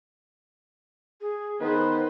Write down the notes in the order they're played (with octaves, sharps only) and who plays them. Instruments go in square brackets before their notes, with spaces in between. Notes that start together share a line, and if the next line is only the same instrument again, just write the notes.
[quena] G#4
[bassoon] D#3 [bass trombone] B3 [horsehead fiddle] B4 C5